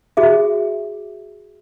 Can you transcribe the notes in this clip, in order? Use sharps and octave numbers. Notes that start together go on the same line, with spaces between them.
F#4 G#4 E5